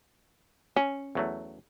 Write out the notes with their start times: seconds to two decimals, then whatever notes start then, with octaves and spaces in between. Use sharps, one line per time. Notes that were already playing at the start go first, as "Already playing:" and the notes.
0.76 C#4
1.15 E2 F#3 A3